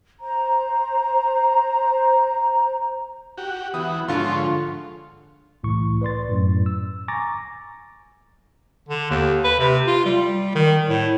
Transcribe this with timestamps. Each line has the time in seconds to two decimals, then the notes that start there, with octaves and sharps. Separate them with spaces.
0.20 C5 A#5
3.38 F#4 G4
3.74 E3 B3 F#4 D#6
4.08 G#2 D3 F3 F4 C#5 C6
5.63 C2 A2 E3 C#6
6.01 B4 D5 C6 A6
6.29 F#2 A2
6.66 E6
7.08 G#5 A#5 C#6 D6 A6 A#6
8.89 D3
9.10 D#2
9.44 B4
9.59 C3
9.87 F4
10.05 G3
10.55 D#3
10.89 A2